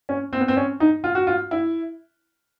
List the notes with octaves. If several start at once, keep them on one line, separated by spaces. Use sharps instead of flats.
C#4
C4
B3
C4
C#4
D#4
F4
F#4
F4
E4